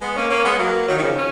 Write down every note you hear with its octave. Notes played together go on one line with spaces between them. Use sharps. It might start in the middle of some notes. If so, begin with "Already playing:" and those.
G#3 B3
A#3 C#4
A#3 C#4
G#3 B3
F#3 A#3
D#3 F#3
D#3
C#3 F3
C#4